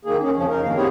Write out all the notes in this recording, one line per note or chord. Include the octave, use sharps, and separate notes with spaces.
D#3 A#3 G#4
C#4
F2 C#3 F3 C#4
D#4 A#4
G2 D#3 A#3 F5
B3 C4 E4 G4 G#4 C#5